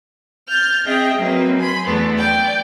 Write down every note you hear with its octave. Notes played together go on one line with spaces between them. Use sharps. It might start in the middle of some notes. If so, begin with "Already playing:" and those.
F6 G6 A6
C4 G#4 D#5 E5 G5
F#3 A#3 C4 B4
G#5 B5 C6
E2 A3 B3 D4
D5 G5